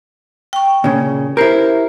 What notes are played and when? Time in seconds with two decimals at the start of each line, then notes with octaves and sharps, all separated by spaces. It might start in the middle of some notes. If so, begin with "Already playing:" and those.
0.53 G5 C#6
0.84 A#2 C#3
1.37 E4 G4 A#4 C5